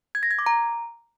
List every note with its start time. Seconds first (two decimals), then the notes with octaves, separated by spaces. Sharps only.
0.15 G#6
0.23 A#6
0.31 G#6
0.39 D6
0.46 A#5